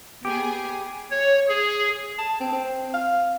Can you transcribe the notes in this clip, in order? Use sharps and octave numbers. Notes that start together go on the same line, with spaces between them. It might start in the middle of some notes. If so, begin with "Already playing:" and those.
B3 G4 G#4 G#5
C#5
G#4
A5
C4
C4
F5